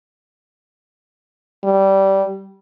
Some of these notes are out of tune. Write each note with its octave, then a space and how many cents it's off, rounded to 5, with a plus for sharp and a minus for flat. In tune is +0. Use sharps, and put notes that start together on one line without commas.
G3 -15